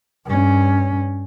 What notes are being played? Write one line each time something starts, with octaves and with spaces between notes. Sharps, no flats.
G2 C#4